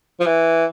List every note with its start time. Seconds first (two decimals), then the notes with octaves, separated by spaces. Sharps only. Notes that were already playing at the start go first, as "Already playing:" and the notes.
0.20 F3
0.26 E3